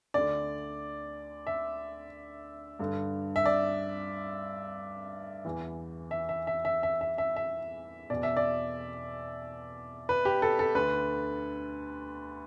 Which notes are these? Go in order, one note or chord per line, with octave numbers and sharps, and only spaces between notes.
D2 D3 D5
E5
G2 D3
E5
D5
E2 E3
E5
E5
E5
E5
E5
E5
E5
E5
E2 B2 D5
E5
D5
B4
G4
A4
A4
D2 D3 B4